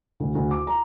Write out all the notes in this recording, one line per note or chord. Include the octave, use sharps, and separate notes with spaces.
D2
D2
D6
A#5